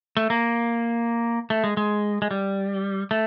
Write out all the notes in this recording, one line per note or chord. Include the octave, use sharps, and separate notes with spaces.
A3
A#3
A3
G#3
G#3
G#3
G3
A3